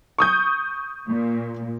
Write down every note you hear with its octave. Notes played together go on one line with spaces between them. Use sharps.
C#6 D#6 G6
A#2